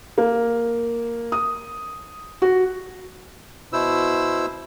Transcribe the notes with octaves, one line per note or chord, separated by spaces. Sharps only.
A#3
D#6
F#4
B2 E4 C5 E6